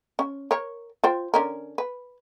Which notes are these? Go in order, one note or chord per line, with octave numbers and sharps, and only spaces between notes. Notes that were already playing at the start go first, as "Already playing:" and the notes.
C#4
A#4 C#5
F4 C5 G5
D3 C#4 A#4
B4